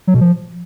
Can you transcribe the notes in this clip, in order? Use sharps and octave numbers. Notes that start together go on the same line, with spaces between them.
F#3
B2
F3